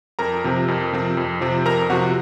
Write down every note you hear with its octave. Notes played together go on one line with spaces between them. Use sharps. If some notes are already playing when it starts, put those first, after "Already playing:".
F2 A#4 A#5
C3 F3 C4
F2
C3 F3 C4
F2
C3 F3 C4
F2 A#4 A#5
C3 F3 C4 F#4 F#5